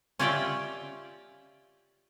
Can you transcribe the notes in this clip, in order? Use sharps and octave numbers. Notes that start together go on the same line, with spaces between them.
C#4 F4 G4 D5 E5 G5